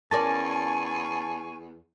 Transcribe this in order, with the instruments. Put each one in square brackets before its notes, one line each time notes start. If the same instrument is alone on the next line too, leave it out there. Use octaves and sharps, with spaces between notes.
[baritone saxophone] E2 [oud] C#4 A#4 D5 [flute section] G#5 C#6 [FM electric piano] A5 A6